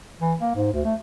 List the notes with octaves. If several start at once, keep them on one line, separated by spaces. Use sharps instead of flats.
E3
A#3
G#2
D2
A3